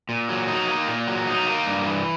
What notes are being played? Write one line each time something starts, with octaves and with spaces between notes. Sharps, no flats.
A#2
F#3
D#4
A#3
A#2
F#3
D#4
A#3
G2
E3